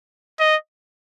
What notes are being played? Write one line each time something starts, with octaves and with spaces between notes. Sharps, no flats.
D#5